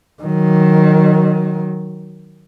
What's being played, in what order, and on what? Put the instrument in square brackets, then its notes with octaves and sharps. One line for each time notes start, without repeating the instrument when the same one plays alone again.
[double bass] D#3 F#3